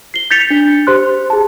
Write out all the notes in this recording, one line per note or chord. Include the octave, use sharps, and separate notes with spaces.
C7 G7
G6 A6 B6 C#7 F7
D4
G4 C5 C6 F#6
G#4 A5